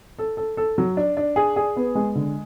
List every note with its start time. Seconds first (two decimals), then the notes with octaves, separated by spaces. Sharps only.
0.19 A4
0.37 A4
0.57 A4
0.78 F#3
0.97 D4
1.17 D4
1.36 G#4
1.56 G#4
1.76 B3
1.95 G#3
2.15 D3